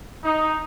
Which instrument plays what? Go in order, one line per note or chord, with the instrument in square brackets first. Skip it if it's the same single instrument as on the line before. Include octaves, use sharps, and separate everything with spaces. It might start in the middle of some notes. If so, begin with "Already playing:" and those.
[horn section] D#4